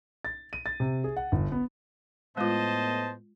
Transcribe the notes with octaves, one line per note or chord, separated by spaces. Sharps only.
A6
D#7
A6
C3
G#4
F#5
G1
B3
A2 G#3 B3 F4 C5 D#5 A5